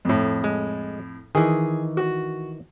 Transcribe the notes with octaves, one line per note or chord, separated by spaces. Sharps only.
F2 A2
G#3
D#3 E3 G#4
F#4